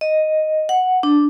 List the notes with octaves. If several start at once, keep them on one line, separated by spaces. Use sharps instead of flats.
D#5
F#5
D4